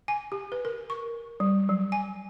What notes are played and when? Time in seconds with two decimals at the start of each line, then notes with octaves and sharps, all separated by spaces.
0.08 G#5
0.32 G4
0.52 B4
0.65 A#4
0.90 C#6
1.40 G3
1.69 F#3
1.92 G#5